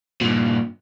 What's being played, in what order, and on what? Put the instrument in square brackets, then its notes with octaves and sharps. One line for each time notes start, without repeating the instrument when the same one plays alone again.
[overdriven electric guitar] G2 A#2